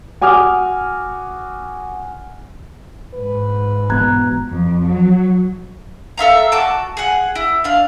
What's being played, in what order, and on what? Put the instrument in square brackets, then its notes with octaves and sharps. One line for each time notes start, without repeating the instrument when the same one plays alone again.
[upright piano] F#4 G#5 D6 D#6 F6
[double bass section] G#2 [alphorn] B4
[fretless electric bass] E1 B2 B3 [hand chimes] A#5 F#6 G#6
[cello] F2
F#3
[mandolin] A4 E5 F5 A#5
F#4 A5 D6
G#4 F#5
E4
D4 F5